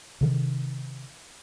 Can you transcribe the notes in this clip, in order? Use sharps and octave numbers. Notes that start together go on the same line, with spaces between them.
C3 D#3